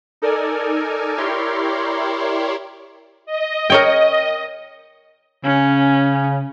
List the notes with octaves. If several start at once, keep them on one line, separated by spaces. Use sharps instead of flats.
D#4 A4 A#4 D5 G#5
E4 G4 A#4 C#5 D5 C6
D#5
A#4 C#5 G5
C#3 C#4